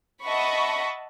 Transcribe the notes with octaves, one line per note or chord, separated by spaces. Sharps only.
D#5 E5 F#5 A5 B5 C#6